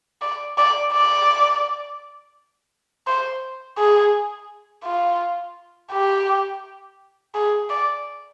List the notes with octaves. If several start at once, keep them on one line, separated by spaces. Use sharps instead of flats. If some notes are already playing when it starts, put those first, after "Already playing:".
D5
D5
D5
C5
G#4
F4
G4
G#4
D5